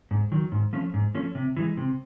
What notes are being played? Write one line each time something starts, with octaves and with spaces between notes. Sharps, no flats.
G#2
D#3 F#3
G#2
F3 A3 C#4
G#2
F3 A3 C#4
C3
E3 G#3
C3